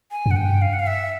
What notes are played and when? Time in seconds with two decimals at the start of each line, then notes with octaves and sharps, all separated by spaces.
0.11 G#5
0.26 F#2
0.31 F#5
0.36 G2 G5
0.61 F5
0.73 F#5
0.79 F5
0.87 E5